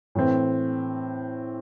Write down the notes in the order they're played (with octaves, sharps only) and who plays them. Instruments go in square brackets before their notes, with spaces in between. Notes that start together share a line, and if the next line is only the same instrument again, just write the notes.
[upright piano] A2 E3 C4